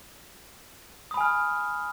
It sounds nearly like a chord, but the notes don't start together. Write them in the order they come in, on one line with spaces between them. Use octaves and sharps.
D#6 B5 G#5 F6